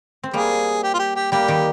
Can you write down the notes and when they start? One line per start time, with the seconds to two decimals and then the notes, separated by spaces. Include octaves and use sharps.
0.23 C4
0.34 G3 A#3 G#4
0.83 G4
0.94 F4
0.99 G4
1.16 G4
1.32 G3 A#3 G4
1.48 D#3 G3